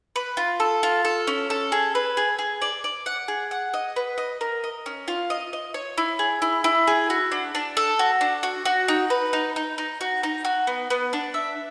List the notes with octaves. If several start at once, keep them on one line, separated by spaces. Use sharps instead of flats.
B4
F4
A4
F4
A4
C#4
A4
G#4
B4
G#4
G#4
D5
D5
F#5
G#4
F#5
D#5
B4
D#5
A#4
D#5
C#4
F4
D#5
D#5
C#5
E4
G#4
E4
E4
G#4
F#4
D4
D4
A4
F#4
D4
F#4
F#4
D#4
B4
D#4
D#4
D#4
F#4
D#4
F#4
B3
B3
D4
E5